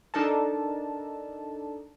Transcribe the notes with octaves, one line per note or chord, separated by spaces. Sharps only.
D4 D#4 A4 A#4 A5